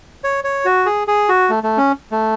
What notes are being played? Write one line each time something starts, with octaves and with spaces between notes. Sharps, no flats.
C#5
C#5
F#4
G#4
G#4
F#4
A3
A3
C#4
A3